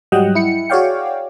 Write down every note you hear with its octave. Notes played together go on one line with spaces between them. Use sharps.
G#2 F#3 G3 D#5 F#5 G5
E4 C#7
F#4 G#4 C#5 D5 F5 G5